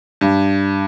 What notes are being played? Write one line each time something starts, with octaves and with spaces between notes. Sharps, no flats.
G2